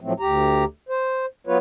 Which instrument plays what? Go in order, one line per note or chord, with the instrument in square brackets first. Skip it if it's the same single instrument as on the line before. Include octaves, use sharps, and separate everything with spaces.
[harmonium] A2 F3 F#3 A3 C4
D2 G4 A#5
C5
F#3 B3 F4 B4 C#5